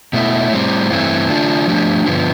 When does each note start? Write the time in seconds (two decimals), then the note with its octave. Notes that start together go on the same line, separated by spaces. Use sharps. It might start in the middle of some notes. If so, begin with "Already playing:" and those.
0.13 B2 A3 E4
0.52 A2 G3 C4
0.90 G2 E3 A3 C4
1.29 D3 A3 D4 F4
1.67 F3 A3 D4 G4
2.06 G2 D3 F3 B3